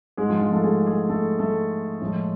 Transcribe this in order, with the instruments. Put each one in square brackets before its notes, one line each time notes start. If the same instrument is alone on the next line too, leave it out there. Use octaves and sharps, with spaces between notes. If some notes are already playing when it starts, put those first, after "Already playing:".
[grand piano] G#2 G#3 G#4
F3 F4
F3 F4
A3 A4
G#3 G#4
G#3 G#4
A3 A4
A3 A4
A2 F3 G#3